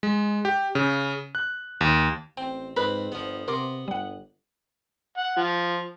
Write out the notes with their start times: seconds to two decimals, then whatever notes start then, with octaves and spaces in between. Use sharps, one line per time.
0.03 G#3
0.45 G4
0.75 C#3
1.35 F#6
1.81 D#2
2.37 A1 C4 G5
2.76 F2 G#2 C4 B4 B5
3.12 G1 F3 B3
3.48 C3 B3 A#4 C6 D6
3.88 G1 G3 F#5
5.18 F#5
5.37 F3